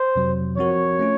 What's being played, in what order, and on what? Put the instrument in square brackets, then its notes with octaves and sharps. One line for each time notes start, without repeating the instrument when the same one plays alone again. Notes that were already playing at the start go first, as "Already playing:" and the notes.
Already playing: [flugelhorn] C5
[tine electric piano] F2 C3 F#3
[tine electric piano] F3 C4 F#4 A#4 [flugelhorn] C#5
[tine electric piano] A3 C#4 F4